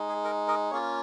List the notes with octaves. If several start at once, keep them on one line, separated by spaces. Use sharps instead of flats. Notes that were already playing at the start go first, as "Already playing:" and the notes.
Already playing: G#3 D#4
G#4
A#4
A#4 D#5
A#3 C#4 F4 G#4 C#5